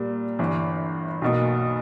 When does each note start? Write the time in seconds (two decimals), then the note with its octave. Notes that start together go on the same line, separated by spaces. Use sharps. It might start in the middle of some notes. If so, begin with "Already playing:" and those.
Already playing: A#2 G3 A#3
0.39 G1 G2 E3
1.22 B1 B2 A#3